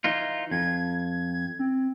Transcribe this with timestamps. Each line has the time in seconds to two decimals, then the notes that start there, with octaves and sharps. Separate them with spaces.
0.04 E3 D#4 F4
0.51 F2 G#6
1.59 C4